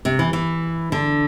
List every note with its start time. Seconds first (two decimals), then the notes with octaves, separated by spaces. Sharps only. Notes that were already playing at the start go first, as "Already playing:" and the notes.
0.05 C3
0.19 E3
0.33 E3
0.92 D3